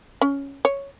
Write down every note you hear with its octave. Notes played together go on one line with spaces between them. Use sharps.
C#4
C#5